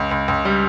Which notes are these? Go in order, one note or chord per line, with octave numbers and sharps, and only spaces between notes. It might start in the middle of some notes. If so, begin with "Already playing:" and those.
Already playing: C#2
C#2
C#2
G3